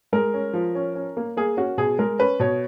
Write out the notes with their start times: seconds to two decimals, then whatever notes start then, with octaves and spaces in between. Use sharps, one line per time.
0.13 G#3 A#4
0.34 C#4
0.54 F3
0.75 C#4
0.95 C#4
1.17 A#3
1.37 A#3 G#4
1.57 C#4 F#4
1.78 B2 G#4
1.99 G#3 A#4
2.19 C#4 B4
2.40 B2 C#5